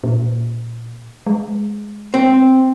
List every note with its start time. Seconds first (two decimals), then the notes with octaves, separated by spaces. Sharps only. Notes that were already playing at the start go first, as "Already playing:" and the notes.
0.04 A#2
1.27 G#3
2.14 C4